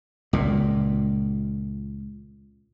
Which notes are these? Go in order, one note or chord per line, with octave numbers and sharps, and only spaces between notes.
C#2 A#2